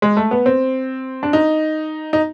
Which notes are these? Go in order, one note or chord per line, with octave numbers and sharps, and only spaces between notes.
G#3
A3
B3
C4
D4
D#4
D#4